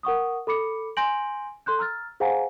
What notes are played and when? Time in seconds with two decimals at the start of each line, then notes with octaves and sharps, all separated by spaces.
0.03 A#4 F#5 C#6 D#6
0.47 A4 B5 D6 C#7
0.97 G#5 C6 G6 A#6 D7 F#7
1.66 A4 C6 F#6 G6
1.79 A#5 E6 F6 A6
2.20 G#4 C5 F5 F#5 G#5 A#5